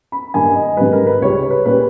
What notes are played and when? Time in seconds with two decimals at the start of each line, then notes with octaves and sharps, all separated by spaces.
0.12 B5
0.34 G2 D#3 A#3 G#5
0.55 D#5
0.77 G#2 D#3 G3 B4
0.92 A#4
1.07 B4
1.22 C#2 C#3 G3 C#5
1.51 B4
1.65 A#2 G3 C#4 B4